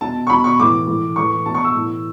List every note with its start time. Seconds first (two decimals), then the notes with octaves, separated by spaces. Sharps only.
0.01 B2 A5
0.27 C#6
0.30 B2 B5
0.44 C#6
0.59 A2 E3 D6
0.87 A2 E3
1.16 A2 E3 C#6
1.46 B2 A5
1.54 C#6
1.64 E6
1.75 A2 E3